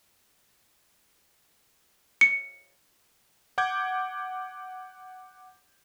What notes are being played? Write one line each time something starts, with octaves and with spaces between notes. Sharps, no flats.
C#7
F#5 D6 G6 G#6